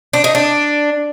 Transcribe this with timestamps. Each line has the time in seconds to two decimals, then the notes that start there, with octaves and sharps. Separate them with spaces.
0.13 D4
0.24 D#4
0.35 D4